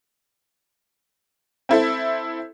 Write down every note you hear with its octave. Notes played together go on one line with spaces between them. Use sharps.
C4 E4 A4